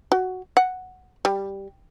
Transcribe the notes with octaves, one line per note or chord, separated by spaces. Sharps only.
F#4
F#5
G3